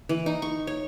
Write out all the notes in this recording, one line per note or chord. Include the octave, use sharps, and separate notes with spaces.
E3
D#4
C#6
C#5